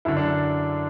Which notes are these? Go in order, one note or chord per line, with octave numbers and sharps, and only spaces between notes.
F#2 D3 E4
D4